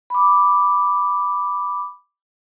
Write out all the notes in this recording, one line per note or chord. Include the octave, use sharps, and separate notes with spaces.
B5 D6